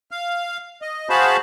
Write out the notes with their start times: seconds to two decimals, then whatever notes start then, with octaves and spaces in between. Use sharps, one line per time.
0.11 F5
0.82 D#5
1.10 F#4 G#4 C5 F5 A5 B5